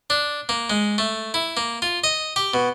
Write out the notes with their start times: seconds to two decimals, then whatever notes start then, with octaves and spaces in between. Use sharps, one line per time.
0.10 D4
0.49 A#3
0.70 G#3
0.98 A3
1.34 E4
1.57 A#3
1.82 F4
2.04 D#5
2.36 G4
2.54 B2